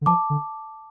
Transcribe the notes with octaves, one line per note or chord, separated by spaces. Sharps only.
D3
F3 A5 D6
D3